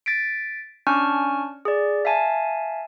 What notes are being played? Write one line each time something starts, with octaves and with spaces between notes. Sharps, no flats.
A6 B6 D7
C#4 D4 G#5 A5 C#6 F6
G#4 D5
E5 F5 G#5 A5